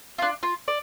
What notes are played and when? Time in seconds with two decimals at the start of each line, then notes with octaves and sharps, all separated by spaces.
0.18 D4 F4
0.43 F4
0.68 D5